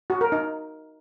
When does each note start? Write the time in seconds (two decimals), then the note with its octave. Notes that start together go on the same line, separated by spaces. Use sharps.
0.10 F#4
0.21 A#4
0.32 D#4